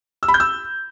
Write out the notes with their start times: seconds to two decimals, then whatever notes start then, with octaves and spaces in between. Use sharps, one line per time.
0.23 E6
0.28 B5
0.34 G6
0.40 E6